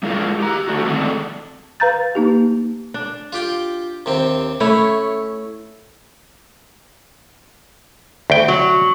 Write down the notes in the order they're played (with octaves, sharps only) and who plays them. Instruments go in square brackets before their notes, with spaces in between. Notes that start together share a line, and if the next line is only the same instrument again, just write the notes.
[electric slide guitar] G#3 D4 E4 F4 G#4 A#4
G4 A#5
A3 D4 F#4
D3 D#3 G#3 A3 C4 D4
[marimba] B4 F5 A#5 G6 A6
A#3 D#4 G4
[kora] D4
[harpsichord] F4 G4 G5
D#2 C3 C4
[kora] A3 E4 C#5 [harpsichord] C#4
[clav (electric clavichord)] D2 G5
[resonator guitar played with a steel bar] F#3